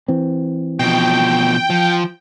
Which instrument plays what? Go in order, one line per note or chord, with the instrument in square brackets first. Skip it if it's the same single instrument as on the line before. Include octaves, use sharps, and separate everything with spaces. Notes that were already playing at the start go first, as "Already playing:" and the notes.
[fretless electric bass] E3 C4
[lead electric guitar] B2 F3 [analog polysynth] G5
[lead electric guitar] F3